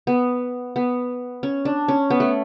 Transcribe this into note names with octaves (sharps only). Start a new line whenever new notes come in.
B3
B3
C#4
D4
C#4
B3
A3